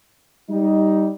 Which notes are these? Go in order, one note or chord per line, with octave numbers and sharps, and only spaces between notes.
G3 D#4